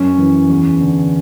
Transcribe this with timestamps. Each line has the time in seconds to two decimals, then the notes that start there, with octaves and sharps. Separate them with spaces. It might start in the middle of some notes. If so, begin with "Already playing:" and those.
Already playing: F#2 C#4
0.18 E3
0.50 E2
0.81 D3